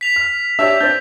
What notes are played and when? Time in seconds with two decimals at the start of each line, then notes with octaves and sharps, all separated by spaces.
0.01 B6 F7
0.16 F6
0.59 D4 G4 C#5 E5 E6
0.80 C4 D4 G6 A6